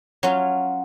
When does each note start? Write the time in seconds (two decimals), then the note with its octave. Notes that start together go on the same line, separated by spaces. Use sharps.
0.23 F#3 C#4 F4